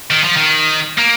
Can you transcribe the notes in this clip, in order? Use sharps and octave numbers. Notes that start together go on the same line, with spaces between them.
D#3
F3
D#3
A#3